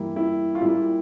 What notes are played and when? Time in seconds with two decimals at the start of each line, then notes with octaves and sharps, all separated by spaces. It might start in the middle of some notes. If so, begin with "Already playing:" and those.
Already playing: G2 E3 G3 A#3 E4
0.16 E4
0.55 F4
0.61 A#2 G3 A#3 E4